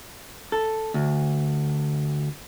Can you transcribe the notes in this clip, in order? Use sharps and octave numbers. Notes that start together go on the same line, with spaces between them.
A4
D2